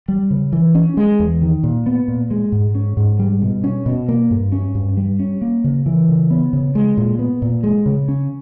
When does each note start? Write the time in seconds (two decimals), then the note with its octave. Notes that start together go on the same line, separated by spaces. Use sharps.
0.08 G3
0.31 C#3
0.53 E3
0.75 C#4
0.97 G#3
1.19 E2
1.42 D#3
1.63 A#2
1.86 B3
2.08 A#2
2.31 G#3
2.52 G#2
2.75 C#4
2.97 G#2
3.19 G3
3.42 B2
3.64 C#4
3.86 B2
4.09 A#3
4.31 G2
4.52 C#4
4.75 G2
4.97 G3
5.19 C#4
5.42 A#3
5.64 C#3
5.86 E3
6.09 C#3
6.30 B3
6.53 C#3
6.75 G#3
6.97 A#2
7.19 B3
7.42 A#2
7.64 G#3
7.86 C#3
8.08 C#4